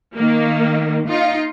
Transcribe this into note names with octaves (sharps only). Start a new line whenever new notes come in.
D#3 A#3
D#4 F4